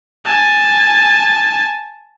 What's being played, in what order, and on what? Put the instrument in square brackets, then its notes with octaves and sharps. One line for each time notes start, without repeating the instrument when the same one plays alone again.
[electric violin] G#5 A5